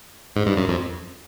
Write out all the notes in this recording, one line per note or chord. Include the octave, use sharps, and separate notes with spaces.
G#2
G2
F#2
F2